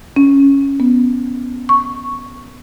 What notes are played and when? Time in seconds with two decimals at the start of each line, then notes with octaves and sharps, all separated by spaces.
0.16 C#4
0.80 B3
1.69 C#6